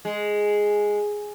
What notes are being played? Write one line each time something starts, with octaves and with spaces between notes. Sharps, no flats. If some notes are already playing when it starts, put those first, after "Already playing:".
G#3